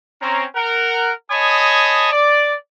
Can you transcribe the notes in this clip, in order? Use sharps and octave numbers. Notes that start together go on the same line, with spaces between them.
C4 C#4 A#5
A#4 F#5
C#5 D#5 G#5 A5 B5 D#6
D5